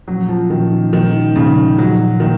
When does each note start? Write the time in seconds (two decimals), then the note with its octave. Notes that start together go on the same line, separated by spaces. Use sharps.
0.08 A#2 F3 F#3 A#3 C#4
0.29 F3
0.50 A#2 D#3 F3 A#3 C#4
0.93 A#2 D#3 F3 G#3 C#4
1.35 A#2 C#3 F3 G#3 C#4
1.78 A#2 F3 F#3 A#3 D#4
2.20 A#2 D#3 F3 A#3